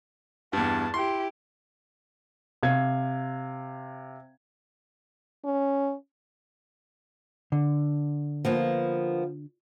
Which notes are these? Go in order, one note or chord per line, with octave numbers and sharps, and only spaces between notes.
E2 G2 A5
E4 G4 C6
C3 F5 G#6
C#4
D3
F3 A#3 B3